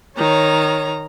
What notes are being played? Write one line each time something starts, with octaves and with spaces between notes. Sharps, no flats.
D#3 C#5 A#5